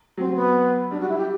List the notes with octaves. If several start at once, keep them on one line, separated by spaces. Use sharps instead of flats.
F#3 C4
B3
G3 D4
F#4
E4
G4